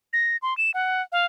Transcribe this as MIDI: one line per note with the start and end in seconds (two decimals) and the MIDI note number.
0.13 0.37 94
0.42 0.56 84
0.57 0.71 100
0.74 1.02 78
1.12 1.25 77